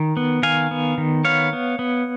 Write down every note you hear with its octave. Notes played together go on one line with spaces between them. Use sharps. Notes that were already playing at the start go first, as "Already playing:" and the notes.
Already playing: D#3
B3
D#3 F5 G#5
B3
D#3
B3 C#5 F5
B3
B3